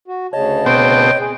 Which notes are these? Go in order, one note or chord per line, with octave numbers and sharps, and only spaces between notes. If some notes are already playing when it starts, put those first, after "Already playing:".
F#4
D2 C#3 C#5 D#5 A5
B2 C4 G5
G#4